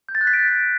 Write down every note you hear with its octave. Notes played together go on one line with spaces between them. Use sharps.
G6
A6
F#6
B6
D7